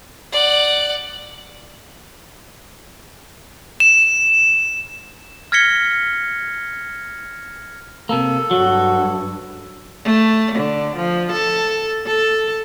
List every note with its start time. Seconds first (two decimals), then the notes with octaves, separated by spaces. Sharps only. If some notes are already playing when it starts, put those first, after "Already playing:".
0.32 D5 F#5
3.80 E7
5.52 F6 G#6 A#6 B6 C#7 G7
8.09 C3 A#3 A4
8.51 G2 F#3 F#4
10.04 A3
10.56 D3
10.96 F3
11.32 A4
12.07 A4